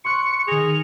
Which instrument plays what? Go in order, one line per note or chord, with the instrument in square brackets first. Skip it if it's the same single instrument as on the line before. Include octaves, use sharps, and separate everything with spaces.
[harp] C6 C#6 F#6 [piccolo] C#7
[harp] D#3 A#6 [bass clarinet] G#4 [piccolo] F7